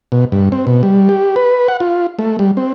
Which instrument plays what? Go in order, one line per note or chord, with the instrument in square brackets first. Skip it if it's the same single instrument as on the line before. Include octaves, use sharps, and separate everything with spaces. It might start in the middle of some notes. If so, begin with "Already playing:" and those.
[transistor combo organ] B2
G2
C4
B2
G3
G4
B4
F#5
F4
A3
G3
C4